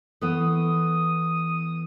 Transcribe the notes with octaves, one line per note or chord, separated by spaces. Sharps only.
E3 A3 B3 D#6